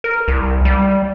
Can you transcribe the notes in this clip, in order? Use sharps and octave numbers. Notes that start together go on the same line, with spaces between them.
A#4
C2
G3